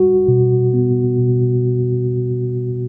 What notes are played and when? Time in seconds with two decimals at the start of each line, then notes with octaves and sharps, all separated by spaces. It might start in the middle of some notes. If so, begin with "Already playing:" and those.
Already playing: G3 F#4
0.28 B2
0.74 B3
1.18 B2